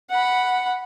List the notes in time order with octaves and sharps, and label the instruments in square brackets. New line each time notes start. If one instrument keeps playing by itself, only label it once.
[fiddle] F#5 B5